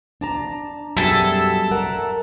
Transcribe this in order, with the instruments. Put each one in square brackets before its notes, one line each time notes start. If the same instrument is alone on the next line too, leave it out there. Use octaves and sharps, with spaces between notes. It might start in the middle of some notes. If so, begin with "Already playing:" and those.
[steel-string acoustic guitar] D4 A5 A#5
[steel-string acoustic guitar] F#2 B2 G3 [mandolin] G#4 A4 E5
[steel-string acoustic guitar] A#4 F#5